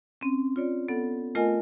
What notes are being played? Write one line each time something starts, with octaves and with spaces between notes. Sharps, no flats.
C4 C#4
F4 C#5 D5
B3 A4 F#5
A3 F4 A#4 D#5 F#5 G#5